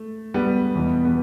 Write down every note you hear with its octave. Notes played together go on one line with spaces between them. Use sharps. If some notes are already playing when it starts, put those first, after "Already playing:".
Already playing: A3
G3 B3
E2 B2
B3